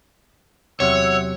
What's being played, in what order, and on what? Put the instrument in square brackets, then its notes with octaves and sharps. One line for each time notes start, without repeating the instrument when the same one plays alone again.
[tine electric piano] E2 C3 F#3 [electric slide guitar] C#5 [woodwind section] E5 F#5 E6